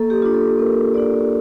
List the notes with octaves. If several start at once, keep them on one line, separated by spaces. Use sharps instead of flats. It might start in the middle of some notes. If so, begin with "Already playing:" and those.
Already playing: A#3 A4
G4
D4 F4
A4
A#3 A#4
D4 F4 D5